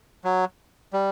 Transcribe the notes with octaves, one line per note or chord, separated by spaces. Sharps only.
F#3
G3